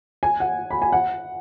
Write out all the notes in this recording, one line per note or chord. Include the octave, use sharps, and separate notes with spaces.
G#5
F#5
B5
G#5
F#5